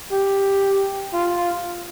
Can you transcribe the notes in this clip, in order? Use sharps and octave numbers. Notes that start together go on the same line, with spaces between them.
G4
F4